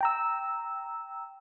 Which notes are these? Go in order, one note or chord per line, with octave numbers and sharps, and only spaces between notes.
G5 A#5 E6